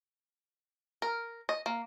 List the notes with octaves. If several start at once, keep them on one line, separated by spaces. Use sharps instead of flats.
A#4
D#5
A#3